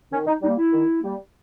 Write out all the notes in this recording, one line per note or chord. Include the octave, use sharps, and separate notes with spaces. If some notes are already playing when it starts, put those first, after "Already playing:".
D#3 C#4
D#4
G3 A#3 D#4
E4
D#3
G3 A#3